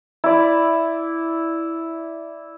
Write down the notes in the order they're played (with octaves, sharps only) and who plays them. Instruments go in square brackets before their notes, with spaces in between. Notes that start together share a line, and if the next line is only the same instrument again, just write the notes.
[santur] E4 D5